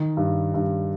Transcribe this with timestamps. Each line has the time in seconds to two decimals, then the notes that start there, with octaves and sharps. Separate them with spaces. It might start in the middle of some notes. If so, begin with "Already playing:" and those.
Already playing: D#3
0.17 G2
0.54 G2